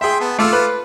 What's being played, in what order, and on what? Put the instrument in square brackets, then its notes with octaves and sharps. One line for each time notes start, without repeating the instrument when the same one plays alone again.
[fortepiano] G#4 E5 [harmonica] G5 C6
[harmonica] B3 A5
[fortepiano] A3 E6 [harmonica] F4 A4 D6
[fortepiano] B4